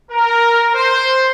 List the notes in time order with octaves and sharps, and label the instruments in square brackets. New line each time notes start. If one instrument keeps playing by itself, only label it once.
[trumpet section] A#4
C5